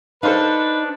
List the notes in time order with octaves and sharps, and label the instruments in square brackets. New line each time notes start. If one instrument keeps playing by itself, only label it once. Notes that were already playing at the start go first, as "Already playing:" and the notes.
[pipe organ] D4 [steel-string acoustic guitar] D#4 [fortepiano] A4 C5 F5 [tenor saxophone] B4